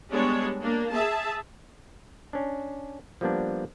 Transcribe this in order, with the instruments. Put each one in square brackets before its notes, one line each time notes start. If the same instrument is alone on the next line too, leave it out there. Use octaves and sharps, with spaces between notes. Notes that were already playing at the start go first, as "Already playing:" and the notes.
[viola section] G3 G#3 B3 D4 C#5
A#3 D4
G#4 E5 A5
[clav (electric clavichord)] C#4 D4
F3 G3 A#3 B3 D4